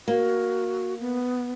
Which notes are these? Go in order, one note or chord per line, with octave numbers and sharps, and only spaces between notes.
A#3 F#4
B3